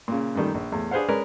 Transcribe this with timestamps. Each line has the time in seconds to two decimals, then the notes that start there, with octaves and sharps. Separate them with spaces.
0.08 A#2 C#3
0.35 F#2 A#2 D#3 G3 A3
0.54 A#1
0.72 E2 A2
0.91 D4 G#4 B4 C5 F5 F#5
1.08 G#3 C#4 A#4 B4 D5